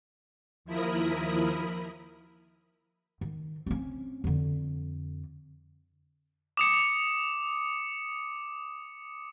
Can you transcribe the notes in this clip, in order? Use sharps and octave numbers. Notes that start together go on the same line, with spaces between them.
D#2 F3 E4 A#4 B5 D#6
D#3
C4 C#4
F2 D3
D6 D#6 C#7